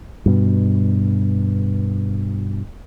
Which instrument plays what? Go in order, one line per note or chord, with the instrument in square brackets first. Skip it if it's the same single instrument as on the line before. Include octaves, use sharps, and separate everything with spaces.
[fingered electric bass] G2 B2